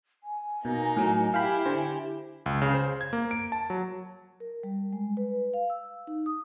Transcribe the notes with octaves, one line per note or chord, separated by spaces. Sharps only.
G#5
B2 A#3 D#4
A2 F#3
E4 G4 F5 G5 B5
D3 C5
C#2
C#3
C5
G#6
A#3
D7
A5
F#3
A#4
G3
G#3
B4
F5
E6
D#4
D#6